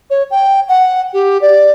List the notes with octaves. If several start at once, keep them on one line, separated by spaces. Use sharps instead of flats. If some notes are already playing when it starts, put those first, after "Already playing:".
C#5
G5
F#5
G4
D5